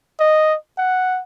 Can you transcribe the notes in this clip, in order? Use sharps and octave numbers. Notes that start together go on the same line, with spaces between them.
D#5
F#5